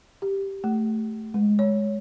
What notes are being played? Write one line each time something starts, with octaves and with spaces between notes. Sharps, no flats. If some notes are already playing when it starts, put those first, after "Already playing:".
G4
A3
G#3
C#5